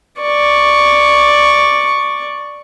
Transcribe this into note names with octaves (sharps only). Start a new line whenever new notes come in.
D5 C#6